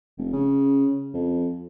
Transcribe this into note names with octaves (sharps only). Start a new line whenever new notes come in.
F1
C#3
F2